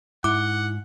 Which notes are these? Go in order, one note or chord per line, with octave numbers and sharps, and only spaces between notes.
G#2 E4 F#5 D6